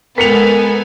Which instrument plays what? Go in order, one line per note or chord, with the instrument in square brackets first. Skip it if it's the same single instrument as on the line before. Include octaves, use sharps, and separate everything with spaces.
[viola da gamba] G#3 A4 [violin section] B3 G#5 [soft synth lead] A#4 [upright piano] B6 C#7 F7